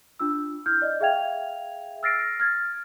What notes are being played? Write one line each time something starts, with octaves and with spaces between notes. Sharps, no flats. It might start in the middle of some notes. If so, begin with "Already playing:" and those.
D4 F4 E6
E4 F6 G6
D5 D#5
G#4 E5 F5 G5 G#6 F7
E6 F6 A6 A#6 C7 D7
F6 G#6 A6